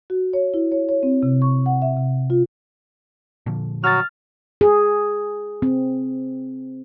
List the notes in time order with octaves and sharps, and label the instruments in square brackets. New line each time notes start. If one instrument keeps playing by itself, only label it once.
[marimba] F#4
C#5
E4
C#5
C#5
C4
C3
C#6
F#5
E5
C3
F4
[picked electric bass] A#2 D3 F3
[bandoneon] F#3 F#4 [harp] F6 A6
[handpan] G#4
C4